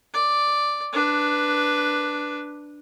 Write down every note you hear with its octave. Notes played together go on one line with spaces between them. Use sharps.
D5
D4 B4